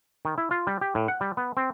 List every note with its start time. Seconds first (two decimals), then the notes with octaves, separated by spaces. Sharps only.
0.25 D#3
0.38 E4
0.51 F4
0.67 G3
0.81 G4
0.95 A2
1.08 F#5
1.21 G3
1.37 B3
1.57 C4